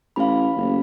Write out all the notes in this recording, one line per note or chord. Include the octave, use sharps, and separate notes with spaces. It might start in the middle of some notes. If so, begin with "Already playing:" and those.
A1 F5 B5
F#1